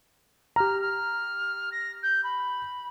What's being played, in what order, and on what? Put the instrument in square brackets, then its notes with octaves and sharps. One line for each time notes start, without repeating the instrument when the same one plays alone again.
[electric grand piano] G4 A#5 [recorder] F6
[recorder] F6
A#6
G6
B5